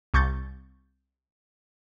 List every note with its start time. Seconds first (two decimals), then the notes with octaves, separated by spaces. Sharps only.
0.14 C2 C#6 G6 A6